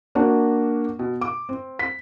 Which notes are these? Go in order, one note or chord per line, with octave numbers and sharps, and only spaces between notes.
A#3 D4 F#4
B2
D6
C4
B6